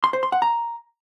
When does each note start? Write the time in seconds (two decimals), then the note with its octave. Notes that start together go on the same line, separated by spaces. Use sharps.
0.04 C6
0.13 C5
0.23 C6
0.32 F#5
0.42 A#5